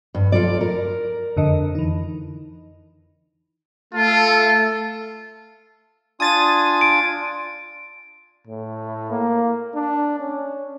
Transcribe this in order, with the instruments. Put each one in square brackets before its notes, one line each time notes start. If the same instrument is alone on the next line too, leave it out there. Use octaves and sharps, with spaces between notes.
[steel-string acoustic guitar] G2
F4 A4 D5
A#4
[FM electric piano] F2 D3 D#5
E3 D#4
[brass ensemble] A3 A4 [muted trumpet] F4
[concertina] D4 F4 G#5 [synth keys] D#6 A6 D#7
[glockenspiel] D7
[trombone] A2
A#3
D4
C#4